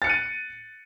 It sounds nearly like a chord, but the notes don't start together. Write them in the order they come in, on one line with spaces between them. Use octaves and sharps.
A6 C#7 F#6 D#7